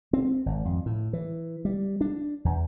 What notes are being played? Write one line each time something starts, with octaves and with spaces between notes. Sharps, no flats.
C4
G#1
F2
A2
E3
G3
D4
E2